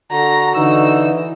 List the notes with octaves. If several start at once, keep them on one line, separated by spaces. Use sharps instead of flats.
D3 F#4 A#5
D3 E3 D#4 E6